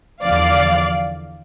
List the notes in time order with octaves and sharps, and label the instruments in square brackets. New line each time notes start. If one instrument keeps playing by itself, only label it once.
[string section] E2 D3 F3 D5 F5